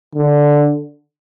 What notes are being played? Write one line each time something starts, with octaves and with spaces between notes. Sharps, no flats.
D3